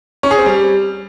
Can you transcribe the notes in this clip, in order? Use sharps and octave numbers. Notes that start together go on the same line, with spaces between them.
C#4
G#4
C4
G3